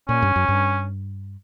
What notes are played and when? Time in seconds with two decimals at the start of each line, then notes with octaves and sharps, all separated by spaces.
0.09 A#2 C#4
0.22 G2
0.36 F#2
0.48 G2